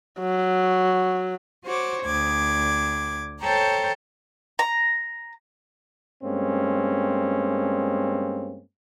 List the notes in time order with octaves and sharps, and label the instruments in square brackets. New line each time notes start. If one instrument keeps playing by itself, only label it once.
[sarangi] F#3
[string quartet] F#4 C5 C#5 D6
D2 D6 G#6
A4 C5 C#5 G5 A5 A#5
[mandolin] A#5
[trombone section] G2 G#3 A#3 C4 C#4